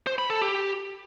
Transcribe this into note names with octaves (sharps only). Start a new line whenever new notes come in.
C5
B5
A4
G4